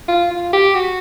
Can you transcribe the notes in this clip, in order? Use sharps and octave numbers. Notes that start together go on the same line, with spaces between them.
F4
F4
G4
F#4